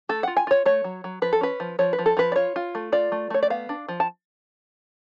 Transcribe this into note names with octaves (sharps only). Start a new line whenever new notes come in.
A3 A4
F4 F#5
G#5
F4 C#5
A3 C#5
F#3
F#3
F3 B4
A4
C#4 B4
F3
F3 C#5
B4
F3
A4
F3 B4
D5
F4 C#5
F4
A3
F4 D5
A3
A3 C#5
D5
B3 F5
D4
F3
A5